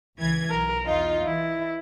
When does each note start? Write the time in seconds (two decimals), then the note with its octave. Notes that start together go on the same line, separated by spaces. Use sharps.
0.19 C#2 E3 G#6
0.50 B1 A#4
0.86 E2 D#4 F4
1.25 E3 E4